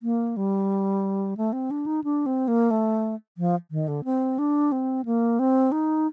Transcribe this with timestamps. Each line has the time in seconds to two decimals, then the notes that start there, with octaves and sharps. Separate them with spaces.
0.03 A#3
0.37 G3
1.37 A3
1.53 C4
1.71 D4
1.86 D#4
2.04 D4
2.26 C4
2.48 A#3
2.71 A3
3.38 F3
3.71 D#3
3.88 D3
4.04 C4
4.39 D4
4.72 C4
5.05 A#3
5.39 C4
5.72 D#4